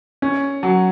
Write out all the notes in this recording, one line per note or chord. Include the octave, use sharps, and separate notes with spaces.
C#4
F#3